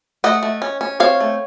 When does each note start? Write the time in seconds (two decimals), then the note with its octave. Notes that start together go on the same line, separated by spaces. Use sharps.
0.24 A3 D#5 F#5
0.43 A3
0.62 C#4
0.81 C#4
1.00 C4 C#5 F5
1.20 A3